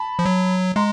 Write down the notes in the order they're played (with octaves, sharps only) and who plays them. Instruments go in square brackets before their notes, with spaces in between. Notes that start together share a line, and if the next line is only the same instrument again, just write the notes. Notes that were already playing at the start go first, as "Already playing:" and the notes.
Already playing: [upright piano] A5 B5
[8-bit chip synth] F3
F#3
[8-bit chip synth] G#3 [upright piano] A#5 C6